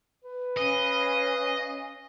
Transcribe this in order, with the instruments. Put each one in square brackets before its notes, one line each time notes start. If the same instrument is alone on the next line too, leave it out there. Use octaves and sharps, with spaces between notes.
[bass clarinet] B4
[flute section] C#4 F5 G#5 [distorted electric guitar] D#5